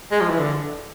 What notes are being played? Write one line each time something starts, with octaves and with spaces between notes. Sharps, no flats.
G#3
F3
E3
D3